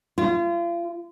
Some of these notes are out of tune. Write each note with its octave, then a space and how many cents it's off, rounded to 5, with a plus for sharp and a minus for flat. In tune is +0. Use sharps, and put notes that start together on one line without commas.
F4 -35